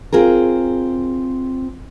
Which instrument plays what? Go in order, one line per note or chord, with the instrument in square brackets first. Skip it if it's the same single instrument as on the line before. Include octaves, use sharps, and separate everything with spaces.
[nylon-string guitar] C4 F4 G#4 A#4